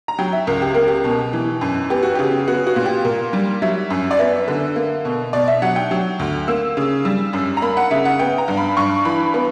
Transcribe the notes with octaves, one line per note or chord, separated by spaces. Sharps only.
A#5
F#3 G5
E5
C#2 A#4
G4
A#3 A#4
G4
B2
E3
F#2
B3 G4
F#4
C#3 G4
B3 F#4
F#4
A#2
G4
A#2 A#4
G3
F#3 E5
F#2
D5
B3 E5
D3
A#3
B2
B2 D5
E5
F#3 F#5
G5
F#3
D2
A#3 E6
C#3
G3 E6
F#2
A#5
A#3 B5
F#5
C#3 E5
F#5
B3 G5
A#5
G2
B5
G2 C#6
E3 B5
B3